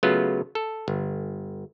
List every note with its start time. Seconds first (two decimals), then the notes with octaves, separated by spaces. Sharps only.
0.03 C#3 F#3 A3 B3 F4
0.55 A4
0.88 G1